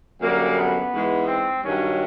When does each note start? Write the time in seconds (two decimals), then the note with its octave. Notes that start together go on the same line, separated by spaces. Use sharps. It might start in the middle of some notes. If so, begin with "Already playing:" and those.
0.20 F#2 D3 G3 A#3
0.55 B3
0.91 G#2 E3 G#3
1.26 C4
1.62 G2 D#3 F#3 C#4